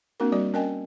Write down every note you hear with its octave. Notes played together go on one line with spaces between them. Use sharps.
A#3 C4 D4 F#4 A#4
G3 F#4 D5
C#4 A#4 D#5 G5 G#5